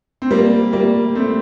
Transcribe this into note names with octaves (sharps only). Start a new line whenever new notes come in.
C4
G3 A#3
G3 A#3
A3 C4